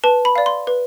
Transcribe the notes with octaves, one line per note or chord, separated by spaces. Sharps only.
B4 A5
B5
D5 F5
C6
B4